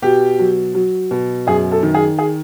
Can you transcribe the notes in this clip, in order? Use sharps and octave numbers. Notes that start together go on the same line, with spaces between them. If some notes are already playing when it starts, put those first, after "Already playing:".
B2 G4
F#3
F#3
B2
F#2 G#4
A4
D#3
G#4
G#4